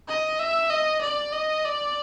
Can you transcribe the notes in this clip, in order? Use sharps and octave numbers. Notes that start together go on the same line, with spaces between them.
D#5
E5
D#5
D5
D#5
D5